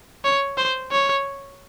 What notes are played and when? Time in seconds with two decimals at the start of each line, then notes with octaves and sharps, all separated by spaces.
0.25 C#5
0.58 C5
0.92 C#5